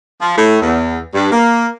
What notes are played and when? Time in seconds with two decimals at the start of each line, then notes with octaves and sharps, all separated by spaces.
0.21 F3
0.37 A2
0.61 E2
1.13 G2
1.32 A#3